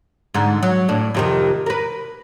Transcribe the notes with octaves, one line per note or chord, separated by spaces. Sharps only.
G#2 D3
F#3
A2 D4
F2 C3 D#3
A#4 B4